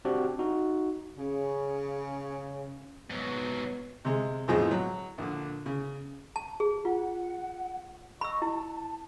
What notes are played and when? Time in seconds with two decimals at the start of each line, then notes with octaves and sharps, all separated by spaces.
0.05 C4 D4 F#4 G4
0.39 D#4 F#4
1.17 C#3 C#4
3.10 G#2 F#3 B3
4.05 C3 G#3
4.48 B1 F2 A2 F3 G#4 D#5
4.71 F#3
5.18 A#1 D3
5.66 C#3
6.36 A5
6.60 G#4
6.85 F4 F#5
8.21 D#5 B5 C#6 E6
8.42 E4 A5